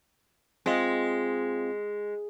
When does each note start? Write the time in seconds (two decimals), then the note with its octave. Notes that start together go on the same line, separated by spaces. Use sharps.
0.66 G#3 C4 F4